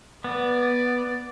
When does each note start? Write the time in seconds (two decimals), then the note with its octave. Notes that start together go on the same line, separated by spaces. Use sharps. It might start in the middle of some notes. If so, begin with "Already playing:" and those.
0.24 B3 D5